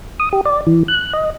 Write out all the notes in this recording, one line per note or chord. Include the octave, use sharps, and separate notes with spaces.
D#6
G4
D5
E3
F#6
D#5